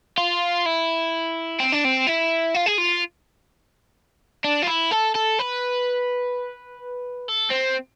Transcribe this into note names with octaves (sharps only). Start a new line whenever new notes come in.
F4
E4
C4
D4
C4
E4
F4
G#4
F4
D4
F4
E4
A4
A4
B4
A4
C4